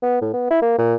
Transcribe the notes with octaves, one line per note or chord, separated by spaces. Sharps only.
B3
A2
B3
E4
A#3
A#2